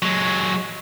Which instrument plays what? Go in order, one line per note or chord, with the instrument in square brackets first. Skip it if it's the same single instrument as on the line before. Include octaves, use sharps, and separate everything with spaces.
[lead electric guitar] F#3 G#3